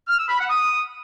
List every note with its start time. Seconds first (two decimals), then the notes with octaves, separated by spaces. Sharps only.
0.07 F6
0.18 E6
0.28 B5
0.39 F#5
0.50 D#6